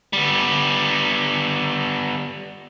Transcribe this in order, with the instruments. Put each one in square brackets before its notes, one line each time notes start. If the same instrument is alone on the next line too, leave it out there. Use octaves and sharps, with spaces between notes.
[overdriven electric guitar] G3 B3